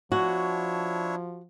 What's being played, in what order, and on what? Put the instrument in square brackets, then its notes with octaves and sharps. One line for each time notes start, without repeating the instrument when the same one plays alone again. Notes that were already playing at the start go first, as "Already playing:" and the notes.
[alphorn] F3 [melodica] D4 E4 C#5 [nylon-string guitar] F#4